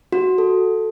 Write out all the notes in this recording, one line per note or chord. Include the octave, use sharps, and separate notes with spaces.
F#4
A4